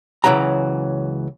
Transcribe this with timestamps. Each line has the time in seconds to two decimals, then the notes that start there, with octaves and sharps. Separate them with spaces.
0.24 C#2 F#2 C#3 E3 F#3 A#5